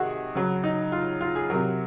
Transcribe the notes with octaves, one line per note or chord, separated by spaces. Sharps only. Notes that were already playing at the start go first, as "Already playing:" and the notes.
Already playing: C3 D#3 F#4 G#4
C#3 F#3
D#4
F4
F4
G#4
C3 F#3 A#4